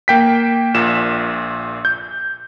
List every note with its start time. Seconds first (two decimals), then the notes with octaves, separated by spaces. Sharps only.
0.08 A#3 G5 B6
0.74 A#1 A#2 E7
1.85 G6